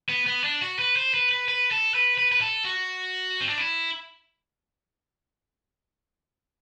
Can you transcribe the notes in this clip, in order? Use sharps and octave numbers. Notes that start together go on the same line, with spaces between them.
B3
B3
D4
F#4
B4
C5
B4
B4
B4
A4
B4
B4
B4
A4
F#4
C4
D4
E4